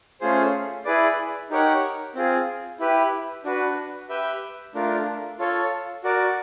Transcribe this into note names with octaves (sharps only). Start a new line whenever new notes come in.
A3 C#4 F4 G#4 C5
E4 G#4 B4 D5
D#4 G4 A#4 C#5 F#5
C4 F4 G#4
E4 G4 B4
D4 F#4 B4
G4 B4 E5 G5
A3 D4 F4 A#4
F4 A4 C#5
F#4 A#4 D5